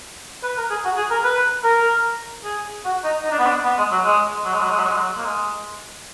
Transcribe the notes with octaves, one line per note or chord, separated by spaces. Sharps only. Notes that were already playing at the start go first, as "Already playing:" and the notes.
B4
A#4
G#4
F#4
G#4
A#4
B4
A#4
G#4
F#4
D#4
D#4
D4
B3
D4
B3
G#3
F#3
G#3
F#3
G#3
F#3
G#3
F#3
G#3
F#3
A#3
G#3